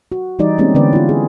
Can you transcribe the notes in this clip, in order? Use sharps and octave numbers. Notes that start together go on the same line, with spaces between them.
F#4
E3 G3 D#4 G4 D5
G#3 A#3 C4 C#4 D#4 G4
D3 E3 B3 C#4 B4 D5
E4 F4
G#4